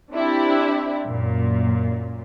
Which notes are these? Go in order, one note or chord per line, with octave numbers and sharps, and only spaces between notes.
C4 D4 E4 G4
F#2 A#2